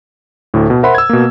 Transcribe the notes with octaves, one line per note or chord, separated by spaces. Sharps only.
D2 A2
B2
A#4 C5 E5 F#5 B5 C6
E6 G#6
B2 A#3